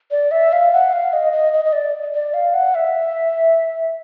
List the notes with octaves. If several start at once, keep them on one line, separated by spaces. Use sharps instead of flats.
D5
E5
F5
F#5
F5
D#5
D#5
D#5
D#5
D5
D5
F5
F#5
E5